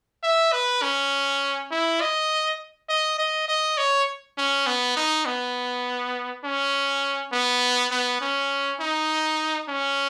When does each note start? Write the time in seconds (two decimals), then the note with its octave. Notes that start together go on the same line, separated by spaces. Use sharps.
0.23 E5
0.52 B4
0.82 C#4
1.71 E4
2.01 D#5
2.89 D#5
3.19 D#5
3.48 D#5
3.78 C#5
4.38 C#4
4.66 B3
4.97 D#4
5.25 B3
6.44 C#4
7.32 B3
7.91 B3
8.21 C#4
8.80 D#4
9.69 C#4